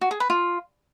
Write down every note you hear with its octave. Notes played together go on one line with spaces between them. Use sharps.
F#4
G#4
B4
F4